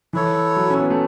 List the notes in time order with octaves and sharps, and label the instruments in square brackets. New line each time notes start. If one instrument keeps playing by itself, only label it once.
[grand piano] E3 [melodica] E4 A4 C#5
[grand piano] F#3
C#4
B3
A3